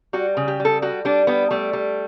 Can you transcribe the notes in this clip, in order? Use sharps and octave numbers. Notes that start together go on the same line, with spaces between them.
G3 F#4
C#3
G4
G3
A4
G3 F#4
G3 D4
G3 B3
G3 A3
G3